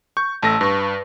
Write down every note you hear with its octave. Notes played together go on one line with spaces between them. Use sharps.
C#6 G6
A1 A3 A5 E6 A#6
G2 B4 C#6